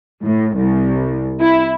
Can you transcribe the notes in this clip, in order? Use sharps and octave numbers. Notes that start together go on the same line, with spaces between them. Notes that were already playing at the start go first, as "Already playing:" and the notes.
A2
C2
E4